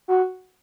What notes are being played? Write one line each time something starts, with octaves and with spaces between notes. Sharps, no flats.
F#4